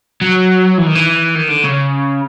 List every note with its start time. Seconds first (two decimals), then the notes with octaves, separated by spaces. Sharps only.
0.21 F#3
0.78 E3
0.86 D#3
0.95 E3
1.35 D#3
1.49 D3
1.64 C#3